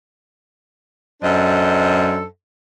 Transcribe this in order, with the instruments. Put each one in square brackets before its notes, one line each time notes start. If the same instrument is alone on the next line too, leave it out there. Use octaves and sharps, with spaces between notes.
[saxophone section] F#2 D4 A4 C5 D#5